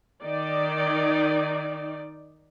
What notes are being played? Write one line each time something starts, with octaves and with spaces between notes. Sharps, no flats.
D#3 D#4 D5